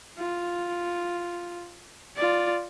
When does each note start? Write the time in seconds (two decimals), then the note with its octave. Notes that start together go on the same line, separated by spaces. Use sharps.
0.17 F4
2.16 F4 D5